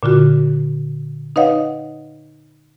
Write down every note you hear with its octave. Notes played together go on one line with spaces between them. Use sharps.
A#2 D3 F4 F#4
D#4 B4 C#5 D#5 F5 F#5